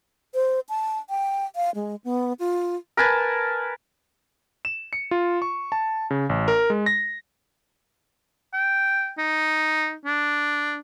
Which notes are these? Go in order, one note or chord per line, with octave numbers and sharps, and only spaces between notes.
C5
A5
G5
F5
G#3
B3
F4
A#4 B4 G#5 A5
E7
C#7
F4
C#6
A5
C#3
A1
A#4
G#3
A#6
G5
D#4
D4